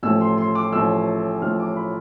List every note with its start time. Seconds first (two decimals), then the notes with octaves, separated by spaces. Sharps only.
0.03 A1 A2 F3 A3 E6
0.21 C6
0.38 C6
0.55 D6
0.72 A1 A2 F3 A3 E6
1.42 A1 A2 F3 A3 F6
1.60 D6
1.77 B5